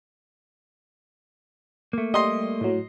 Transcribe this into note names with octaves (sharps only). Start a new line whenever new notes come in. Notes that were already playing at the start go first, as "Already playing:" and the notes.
A3 A#3
G3 D#5 C6
A2 F#3